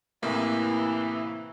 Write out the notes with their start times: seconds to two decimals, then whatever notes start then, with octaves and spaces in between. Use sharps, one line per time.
0.23 A2 C3 E3 A#3